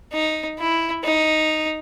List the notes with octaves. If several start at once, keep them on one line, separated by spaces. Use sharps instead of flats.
D#4
E4
D#4